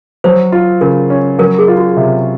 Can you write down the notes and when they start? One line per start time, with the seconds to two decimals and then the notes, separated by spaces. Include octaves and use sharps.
0.24 F#3 C5
0.52 F4
0.81 C#3 A#4
1.10 C#4
1.39 F#3 A#4
1.59 G#4
1.68 F4
1.77 F#4
1.97 C3